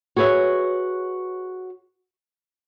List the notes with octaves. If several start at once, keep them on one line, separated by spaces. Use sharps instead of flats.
F#4 G#4 B4 C#5 E5